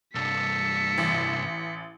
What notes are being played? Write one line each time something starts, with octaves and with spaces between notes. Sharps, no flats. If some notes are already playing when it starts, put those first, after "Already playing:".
C2 G2 A4 B6 C#7
A1